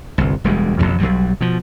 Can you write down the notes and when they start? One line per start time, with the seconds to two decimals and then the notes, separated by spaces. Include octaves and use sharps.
0.18 G1 C2
0.44 E1 D2 G3 G#3
0.79 A1 F2 A2 C3
1.00 B1 G2 F#3 G3
1.41 B2 F3